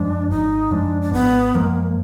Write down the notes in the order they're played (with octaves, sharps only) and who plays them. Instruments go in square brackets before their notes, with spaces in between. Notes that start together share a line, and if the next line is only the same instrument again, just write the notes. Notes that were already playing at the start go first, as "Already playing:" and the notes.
Already playing: [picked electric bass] F#2 F3 G#3 [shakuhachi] D4
[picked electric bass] G#1 [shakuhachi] D#4
[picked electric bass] F#2 F3 G#3 [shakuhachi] D4
[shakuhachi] D4
[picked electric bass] G#1 [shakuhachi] B3
[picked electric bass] F#2 F3 G#3 [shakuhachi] A#3